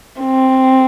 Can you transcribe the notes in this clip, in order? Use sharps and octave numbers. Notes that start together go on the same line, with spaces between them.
C4